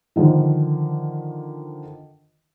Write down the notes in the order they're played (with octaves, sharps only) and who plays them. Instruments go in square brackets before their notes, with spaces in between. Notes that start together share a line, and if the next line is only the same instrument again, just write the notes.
[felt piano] D3 D#3 F3